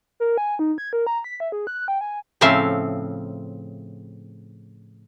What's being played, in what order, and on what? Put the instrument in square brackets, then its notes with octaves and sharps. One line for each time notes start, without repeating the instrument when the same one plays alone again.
[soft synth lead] A#4
G#5
D#4
G#6
A#4
A#5
B6
E5
G#4
F#6
G5
G#5
[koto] A2 C#3 F3 C4 E5 F5